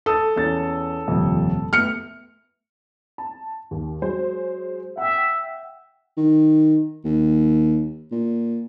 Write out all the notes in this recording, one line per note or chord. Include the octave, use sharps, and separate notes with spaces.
A4 D#6 A6
E2 C#4 A6
D#1 F2 C3
A3 B3 F6 C#7
A5
D#2
F#3 G#3 C5
E5 F#5 G5
D#3
D#2
A#2